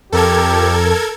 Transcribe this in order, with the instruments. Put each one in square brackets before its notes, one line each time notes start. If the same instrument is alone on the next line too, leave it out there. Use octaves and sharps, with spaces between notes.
[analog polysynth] F2 [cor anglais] G4 [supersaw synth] A4 A#4 G#6